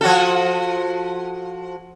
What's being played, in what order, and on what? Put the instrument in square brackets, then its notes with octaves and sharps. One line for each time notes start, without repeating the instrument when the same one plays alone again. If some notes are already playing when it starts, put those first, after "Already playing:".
[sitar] F3 F#4 A4